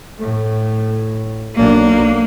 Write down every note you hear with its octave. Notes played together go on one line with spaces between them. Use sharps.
A2 A3
B1 A#3 D4